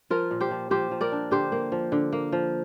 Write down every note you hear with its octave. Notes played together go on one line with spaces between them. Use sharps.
F3 F4 A#4
A#2
G4 C5
F3
F3 G4 C5
F3
A#4 D5
D4
D3 G4 C5
A#3
F3
D3
A#3
F3